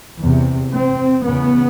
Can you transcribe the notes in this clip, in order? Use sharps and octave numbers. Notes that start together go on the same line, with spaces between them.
E2 C3
C4
E2 C#3 B3